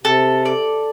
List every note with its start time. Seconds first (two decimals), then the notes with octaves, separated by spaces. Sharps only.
0.04 C3 A4
0.45 D5